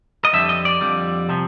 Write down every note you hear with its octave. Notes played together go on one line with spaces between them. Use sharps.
D#5
F2 D3 G3 E5
D#5
D5
F2 D3 G3
C3 F3